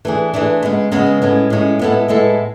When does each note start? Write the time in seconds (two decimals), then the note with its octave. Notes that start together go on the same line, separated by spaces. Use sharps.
0.05 E3 A3 D4 G#4
0.33 E3 A3 D4 G#4
0.63 C#3 G#3 B3
0.92 C#3 G#3 B3
1.22 A2 G#3 C#4
1.50 A2 G#3 C#4
1.79 A2 G#3 B3 E4 A4
2.08 A2 G#3 B3 E4 A4